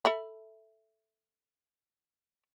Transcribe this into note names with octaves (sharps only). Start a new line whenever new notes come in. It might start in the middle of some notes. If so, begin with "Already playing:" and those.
A4 E5 B5